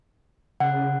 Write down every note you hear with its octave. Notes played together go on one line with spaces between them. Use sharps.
C#3 F#5